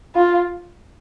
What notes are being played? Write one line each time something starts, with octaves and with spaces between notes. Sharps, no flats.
F4